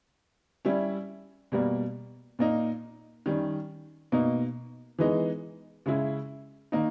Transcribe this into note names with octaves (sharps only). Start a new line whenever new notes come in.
G3 C#4 E4
B2 G3 A#3
A#2 A#3 D#4
D#3 G3 C#4
B2 A#3 D#4
E3 G#3 B3 D#4
C#3 G#3 C#4 E4
D#3 A#3 D#4